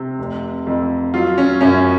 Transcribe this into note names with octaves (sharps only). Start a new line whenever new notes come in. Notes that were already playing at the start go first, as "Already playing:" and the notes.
Already playing: C3
F1
F2
F#3 F4
C#4
F#2 C#4